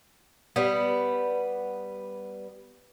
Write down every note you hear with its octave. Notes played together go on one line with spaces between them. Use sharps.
G3 B3